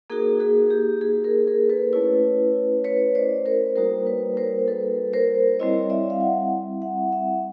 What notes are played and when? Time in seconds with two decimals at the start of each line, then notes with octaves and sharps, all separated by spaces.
0.10 A#3 D#4 F#4 G#4 A#4
0.40 F#4 G#4
0.70 G4
1.01 F#4 G#4
1.24 G#4 A#4
1.47 G#4 A#4
1.70 A4 B4
1.93 A3 C#4 E4 B4 C#5
2.84 B4 C#5
3.15 C5 D5
3.46 A#4 C5
3.76 G3 A#3 D#4 F#4 A#4 C5
4.06 B4 C#5
4.37 A#4 C5
4.68 A4 B4
5.13 A#4 C5
5.59 G3 C4 E4 C#5 D#5
5.90 D5 E5
6.10 F5
6.20 E5 F#5
6.82 E5 F#5
7.12 E5 F#5